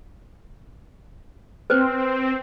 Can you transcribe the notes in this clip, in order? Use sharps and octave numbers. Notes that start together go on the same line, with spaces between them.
C4 B4 C5